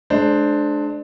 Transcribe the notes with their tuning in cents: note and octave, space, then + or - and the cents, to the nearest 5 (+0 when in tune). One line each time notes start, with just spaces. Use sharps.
G#3 +40 D4 +10 C5 +0